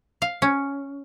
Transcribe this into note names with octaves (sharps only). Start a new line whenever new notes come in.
F5
C#4